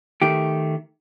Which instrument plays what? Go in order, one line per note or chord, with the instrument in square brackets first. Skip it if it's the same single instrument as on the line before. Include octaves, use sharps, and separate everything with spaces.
[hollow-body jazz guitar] D#3 A3 G4